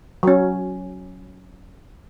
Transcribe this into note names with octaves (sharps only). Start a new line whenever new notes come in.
F#3 C#4